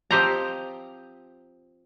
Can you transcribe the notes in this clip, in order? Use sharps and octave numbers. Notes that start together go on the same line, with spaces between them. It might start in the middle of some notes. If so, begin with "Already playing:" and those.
F3 C4 G4 C5 D#5 A#5